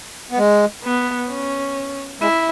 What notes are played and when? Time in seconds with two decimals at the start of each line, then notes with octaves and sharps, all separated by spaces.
0.31 B3
0.38 G#3
0.84 B3
1.30 C#4
2.21 G#3 E4